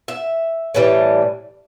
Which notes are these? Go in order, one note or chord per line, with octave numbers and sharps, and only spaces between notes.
E5
A2 E3 G3